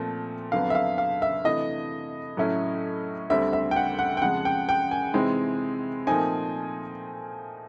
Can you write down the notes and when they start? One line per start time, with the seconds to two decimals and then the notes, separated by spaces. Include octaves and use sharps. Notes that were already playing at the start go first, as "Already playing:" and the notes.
Already playing: A#2 F3 A3 C4
0.52 F2 D3 F#3 B3 F5
0.70 E5
0.75 F5
0.98 F5
1.22 E5
1.44 C3 E3 A3 D4 D#5
2.37 A2 F#3 A3 C#4 E4
3.30 D2 D3 G3 C4 E5
3.53 E5
3.71 G5
3.76 F#5
3.99 F#5
4.17 G5
4.21 F2 C#3 F3 G#3 F#5
4.45 G5
4.69 G5
4.91 G#5
5.14 C3 E3 G#3 C4 D#4
6.07 A#2 F3 A3 C4 D#4 G#5